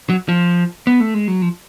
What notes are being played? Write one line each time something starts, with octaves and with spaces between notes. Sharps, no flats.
F#3
F3
B3
A3
G#3
F#3
F3